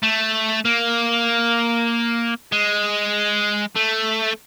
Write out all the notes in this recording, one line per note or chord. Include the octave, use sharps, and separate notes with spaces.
A3
A#3
G#3
A3